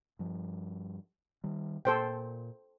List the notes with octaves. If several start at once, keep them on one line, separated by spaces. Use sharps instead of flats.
G2 F3
D#3 G3
A#2 A#3 A4 C5 G5